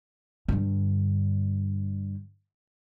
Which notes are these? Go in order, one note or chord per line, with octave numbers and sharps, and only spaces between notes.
G2 D3